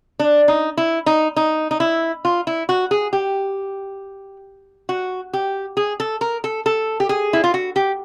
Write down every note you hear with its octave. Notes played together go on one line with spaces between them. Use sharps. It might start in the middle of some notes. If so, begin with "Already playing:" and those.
D4
D#4
E4
D#4
D#4
D#4
E4
F4
E4
F#4
G#4
G4
F#4
G4
G#4
A4
A#4
A4
A4
G4
G#4
E4
F4
F#4
G4